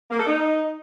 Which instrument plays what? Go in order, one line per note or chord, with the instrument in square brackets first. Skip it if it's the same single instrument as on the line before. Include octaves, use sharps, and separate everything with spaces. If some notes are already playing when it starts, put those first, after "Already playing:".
[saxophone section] A#3
A4
D#4